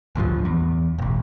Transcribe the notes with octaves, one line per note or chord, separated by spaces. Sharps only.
A1 D2 G2 F3
E2
E1 A1